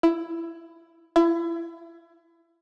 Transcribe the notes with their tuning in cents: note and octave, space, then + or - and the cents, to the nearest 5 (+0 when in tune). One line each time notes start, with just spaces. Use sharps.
E4 +15
E4 +30